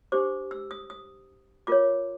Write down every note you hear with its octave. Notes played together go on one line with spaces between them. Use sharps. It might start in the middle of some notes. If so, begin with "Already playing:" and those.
D4 G4 C5 D6
E6
D#6
D#6
F4 A#4 C#5 D6